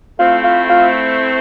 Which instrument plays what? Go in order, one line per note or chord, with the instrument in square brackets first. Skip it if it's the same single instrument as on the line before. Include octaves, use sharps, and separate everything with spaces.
[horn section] A3 C4 E4 [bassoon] F4
[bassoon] F4
F4